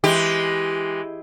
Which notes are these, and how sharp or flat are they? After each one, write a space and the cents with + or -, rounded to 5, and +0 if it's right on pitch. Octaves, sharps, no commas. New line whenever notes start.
E3 +0 G#3 +5 G4 +0